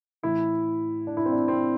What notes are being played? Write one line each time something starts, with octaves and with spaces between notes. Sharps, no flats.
A2 E3 E4
D4
E4
C4
D4
C4